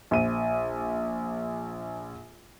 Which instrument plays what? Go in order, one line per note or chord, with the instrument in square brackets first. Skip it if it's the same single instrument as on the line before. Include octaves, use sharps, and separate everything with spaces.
[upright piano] A#1 D#7